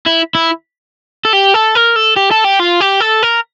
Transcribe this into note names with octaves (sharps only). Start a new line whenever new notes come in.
E4
E4
A4
G4
A4
A#4
A4
G4
A4
G4
F4
G4
A4
A#4